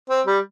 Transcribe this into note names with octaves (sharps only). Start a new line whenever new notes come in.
C4
G3